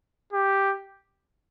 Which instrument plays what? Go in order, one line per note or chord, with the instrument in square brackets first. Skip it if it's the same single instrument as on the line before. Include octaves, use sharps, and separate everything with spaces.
[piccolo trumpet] G4